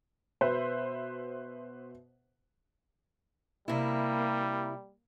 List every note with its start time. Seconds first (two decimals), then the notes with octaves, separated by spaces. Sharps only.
0.41 B2 B4 C5 E5
3.68 C3 G3 A#3 E4